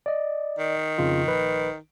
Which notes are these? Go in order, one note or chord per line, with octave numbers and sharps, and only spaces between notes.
D5 D#5
D#3
F2 C#3 F4
A#1 B4